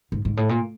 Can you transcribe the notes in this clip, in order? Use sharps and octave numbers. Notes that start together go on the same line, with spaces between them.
G#2
G#2
A2
A#2